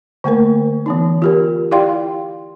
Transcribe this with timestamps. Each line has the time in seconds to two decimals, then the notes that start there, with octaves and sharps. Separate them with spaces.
0.24 D3 A3 A#3 A#4
0.86 E3 B3 D#4
1.22 F4 G4 A#4
1.71 E4 G4 D5 F5 G5 C6